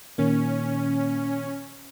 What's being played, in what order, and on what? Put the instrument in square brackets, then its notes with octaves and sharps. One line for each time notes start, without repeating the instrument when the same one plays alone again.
[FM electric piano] A#2 D#3 A#3 [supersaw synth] C#4